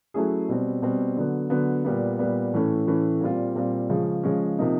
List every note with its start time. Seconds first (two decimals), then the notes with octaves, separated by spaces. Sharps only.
0.14 F#3 A3 C#4 E4 G#4
0.49 B2 G3 C4
0.82 B2 G3 C4
1.16 D3 F#3 B3
1.50 D3 F#3 B3
1.85 A#2 G3 B3
2.19 A#2 G3 B3
2.53 A2 E3 A3 C#4
2.87 A2 E3 A3 C#4
3.21 A#2 G3 C4 F4
3.56 A#2 G3 C4 F4
3.89 C#3 F3 G#3 C#4
4.23 C#3 F3 G#3 C#4
4.59 C3 F3 A#3 D#4